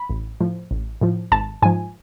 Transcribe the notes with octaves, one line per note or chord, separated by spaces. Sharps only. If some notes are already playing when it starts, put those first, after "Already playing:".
Already playing: B5
A1
A2 F3
A1
A2 F3
G#1 A5
G#2 F3 G#5